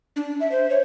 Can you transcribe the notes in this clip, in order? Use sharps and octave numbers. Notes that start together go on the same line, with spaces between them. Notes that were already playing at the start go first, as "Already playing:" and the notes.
D4
E5
C5
C#5